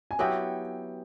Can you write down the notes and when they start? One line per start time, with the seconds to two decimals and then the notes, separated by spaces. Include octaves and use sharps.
0.11 G#5
0.19 F#3 B3 E4 G4 G5